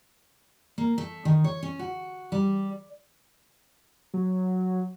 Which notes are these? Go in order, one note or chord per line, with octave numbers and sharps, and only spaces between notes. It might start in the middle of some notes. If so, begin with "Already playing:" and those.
A#3
A3
D#3
C#5
C#4
F#4
G3
F#3